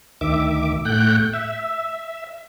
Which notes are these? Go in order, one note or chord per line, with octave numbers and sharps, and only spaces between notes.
D2 D#3 E5 D6
A2 A3 F#5 G5 F#6 G6
E5